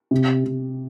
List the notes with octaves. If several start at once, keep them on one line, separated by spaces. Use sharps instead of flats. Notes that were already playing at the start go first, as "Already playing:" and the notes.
C3
C3